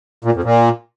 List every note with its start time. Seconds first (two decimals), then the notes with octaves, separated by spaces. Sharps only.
0.24 A#2
0.34 F2
0.44 A#2